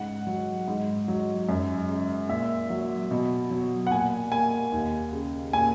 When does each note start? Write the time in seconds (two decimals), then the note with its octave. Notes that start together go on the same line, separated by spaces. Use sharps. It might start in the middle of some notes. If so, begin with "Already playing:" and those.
Already playing: G#2 C#3 F#5
0.27 F#3
0.68 G#2
1.08 F#3
1.49 F#2
1.88 C#3
2.29 A#2 E5
2.70 F#3
3.11 B2
3.50 F#3
3.87 F#5
3.91 A#2 G#5
4.31 A#3 G#5
4.72 D#2
5.12 C#3
5.53 A#2 G#5